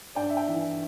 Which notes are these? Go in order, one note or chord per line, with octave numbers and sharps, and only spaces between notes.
G2 D5 G5
E5
D5 G5
E3